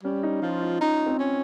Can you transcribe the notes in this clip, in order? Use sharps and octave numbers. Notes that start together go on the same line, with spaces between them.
G3 C#4
D#4
F3 F4
D#4
C#4 D#4
C4
C#4